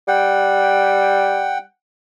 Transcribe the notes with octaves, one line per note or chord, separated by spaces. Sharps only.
G3 F#5 G5